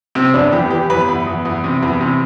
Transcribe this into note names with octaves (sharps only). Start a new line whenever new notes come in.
C3 C4
E2 D4
E2 G4
E3 G4
E2 B4
E2
E2
E2
C3
E2
C3